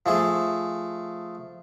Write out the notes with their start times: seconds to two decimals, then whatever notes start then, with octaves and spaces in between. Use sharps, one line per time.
0.06 F3 A3 G#4